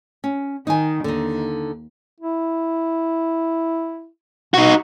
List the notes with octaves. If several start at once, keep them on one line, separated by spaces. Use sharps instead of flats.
C#4
D#3 D#4 G#5
D#2 D3 D#4
E4
B2 D#4 F#4